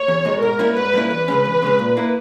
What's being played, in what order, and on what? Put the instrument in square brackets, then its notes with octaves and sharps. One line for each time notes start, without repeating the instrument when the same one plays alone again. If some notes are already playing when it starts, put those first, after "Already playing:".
Already playing: [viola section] C#5
[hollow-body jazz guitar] E2
B2 G#3 D#4
[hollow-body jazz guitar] G#2 [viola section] A#4
[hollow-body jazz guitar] G3 A#3 C#4 E4
[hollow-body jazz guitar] G#2 [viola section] B4
[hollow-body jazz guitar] G3 A#3 C#4 E4
[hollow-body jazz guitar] E2 [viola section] B4
[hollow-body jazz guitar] C#3 G#3 C#4
E2
C#3 G#3 C#4
A#2
A#3 E4